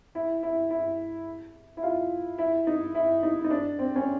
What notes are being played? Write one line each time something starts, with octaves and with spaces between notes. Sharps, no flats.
E4
E4
E4
E4
F4
E4
D#4
E4
D#4
D#4
D4
C4
C#4